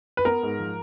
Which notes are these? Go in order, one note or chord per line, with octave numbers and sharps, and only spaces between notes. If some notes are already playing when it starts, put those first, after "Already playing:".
B4
B3 A#4
G#2
F3